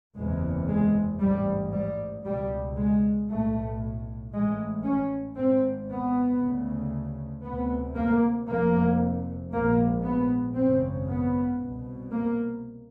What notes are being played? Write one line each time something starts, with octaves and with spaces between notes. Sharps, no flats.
F#1 E2 C3 G#3
G#3
A1 G#2 G3
G3
C#2 B2 G3
G#3
B1 A2 A3
A1 A2 G#3
C#4
G#1 G#2 C4
B3
D2 C#3
D2 C3 B3
A#3
F1 F2 C3 A#3
A#1 G#2 A#3
B3
G#1 F#2 C#3 C4
B3
C2 B2
A#3